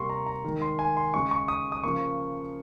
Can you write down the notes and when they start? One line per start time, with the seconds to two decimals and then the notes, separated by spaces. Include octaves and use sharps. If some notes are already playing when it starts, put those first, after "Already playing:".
Already playing: C3 G3 A#3 C6 C#6
0.09 A#5
0.26 A#5
0.44 D#3 G#3
0.61 C6
0.79 G#5
0.97 C6
1.14 C#3 G#3 C#6
1.31 C#6
1.48 D#6
1.72 D#6
1.84 C#3 F3 A#3 C#6